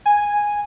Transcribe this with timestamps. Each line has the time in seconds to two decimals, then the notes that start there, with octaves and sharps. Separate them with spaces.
0.06 G#5